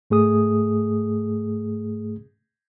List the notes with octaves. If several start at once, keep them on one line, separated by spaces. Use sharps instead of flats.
G#2 A3 G#4 D#6